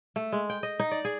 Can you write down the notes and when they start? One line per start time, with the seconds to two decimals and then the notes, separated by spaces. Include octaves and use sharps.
0.16 A3
0.32 G#3
0.50 G5
0.63 D#5
0.79 D#4
0.91 D5
1.05 G#4